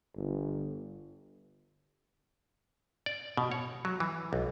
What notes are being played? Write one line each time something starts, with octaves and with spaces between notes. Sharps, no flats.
G1
D5
B2
C#5
F#3
E3
B1